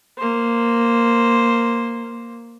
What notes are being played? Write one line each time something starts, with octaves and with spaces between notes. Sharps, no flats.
A#3 C5